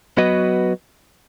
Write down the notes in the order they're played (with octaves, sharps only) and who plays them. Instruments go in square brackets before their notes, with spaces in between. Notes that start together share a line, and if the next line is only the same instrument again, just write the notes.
[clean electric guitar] F#3 B3 F#4 B4 D#5